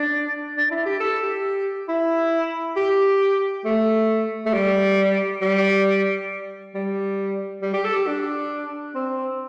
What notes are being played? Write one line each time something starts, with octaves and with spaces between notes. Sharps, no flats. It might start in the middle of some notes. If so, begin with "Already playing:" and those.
Already playing: D4
D4
E4
G4
A4
G4
E4
G4
A3
A3
G3
G3
G3
G3
G4
A4
G4
D4
C4